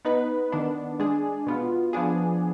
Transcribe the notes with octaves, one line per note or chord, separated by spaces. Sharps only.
B3 D#4 B4
D#3 B3 D4
G#3 D4 G#4
B2 B3 F4
F3 B3 D4 G#4